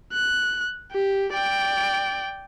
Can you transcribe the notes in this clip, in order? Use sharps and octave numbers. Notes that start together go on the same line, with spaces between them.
F#6
G4
D5 G5